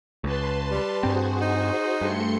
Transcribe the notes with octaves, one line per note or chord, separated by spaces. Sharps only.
C#2 B4 A5 C6
G3
G2 C4 F#4 G#4 C5
D#4
G2 A3 C6 C#7